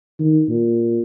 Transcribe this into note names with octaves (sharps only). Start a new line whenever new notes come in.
D#3
A#2